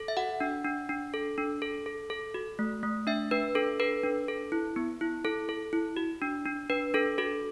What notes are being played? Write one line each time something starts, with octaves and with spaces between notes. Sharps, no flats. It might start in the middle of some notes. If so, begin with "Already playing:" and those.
Already playing: A4
E5
F#4 F#5
D4
D4
D4
A4
D4
A4
A4
A4
F#4
A3
A3
D4 E5
D4 B4
D4 A4
A4 B4
D4
A4
E4
B3
E4
E4 A4
A4
E4
F#4
D4
D4
D4 B4
D4 A4
F#4 A4